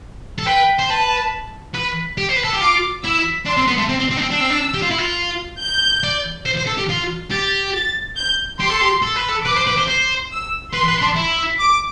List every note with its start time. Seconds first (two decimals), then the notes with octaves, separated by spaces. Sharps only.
0.38 A4
0.46 B4 G5
0.79 C5
0.90 B4 A5
1.74 B4
2.18 G4
2.29 C5
2.36 B4
2.44 A4
2.53 G4
2.61 F4 D6
3.03 E4 E6
3.46 D4 C6
3.57 C4
3.67 B3
3.78 A3
3.89 C4
4.00 C4
4.11 C4
4.17 D4
4.21 C4
4.31 D4 E6
4.41 C4
4.50 D4
4.74 G4
4.82 F4
4.90 E4
4.98 F4
5.61 G6
6.04 D5
6.46 C5
6.57 C5
6.67 A4
6.78 G4
6.89 F4
7.31 G4 A6
7.74 A6
8.16 G6
8.60 G4 C6
8.71 A4
8.81 G4
9.02 A4
9.16 B4
9.28 A4
9.45 B4 D6
9.56 C5
9.67 B4
9.78 C5
9.88 C5
10.31 E6
10.73 B4 C6
10.88 B4
11.02 D4
11.16 E4
11.60 D6